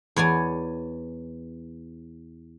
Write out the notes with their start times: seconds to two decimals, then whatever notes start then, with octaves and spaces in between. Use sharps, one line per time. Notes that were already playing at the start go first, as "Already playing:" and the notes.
0.16 E2 C#5 D5 G#5